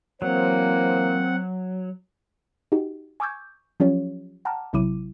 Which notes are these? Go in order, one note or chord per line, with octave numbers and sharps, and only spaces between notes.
E3 F#3 A#3 C4 C5 F#5
D#4 F#4 G4
G#5 C#6 D6 E6 G6 G#6
F3 F#3 C#4 F4 G4 C#5
F#5 G5 A5 A#5 D6 F6
A1 C3 F#3 E4 D6 D#7